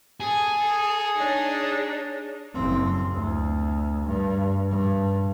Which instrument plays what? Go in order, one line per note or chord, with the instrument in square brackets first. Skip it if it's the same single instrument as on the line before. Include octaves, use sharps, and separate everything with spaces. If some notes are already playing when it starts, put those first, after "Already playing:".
[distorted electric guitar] G#4 [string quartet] A4
[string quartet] D4 D#4 C#5
[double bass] F#1 C4
D2
G2
G2